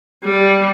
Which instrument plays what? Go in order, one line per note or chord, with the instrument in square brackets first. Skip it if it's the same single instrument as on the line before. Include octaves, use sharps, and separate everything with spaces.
[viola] G3